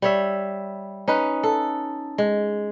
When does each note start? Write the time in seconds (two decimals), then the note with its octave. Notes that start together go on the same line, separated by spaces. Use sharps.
0.02 G3 C#5 E5
1.08 C#4 D#4 B4
1.43 A4
2.18 G#3